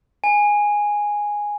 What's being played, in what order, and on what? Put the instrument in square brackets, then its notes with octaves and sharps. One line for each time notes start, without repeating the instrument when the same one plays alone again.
[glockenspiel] G#5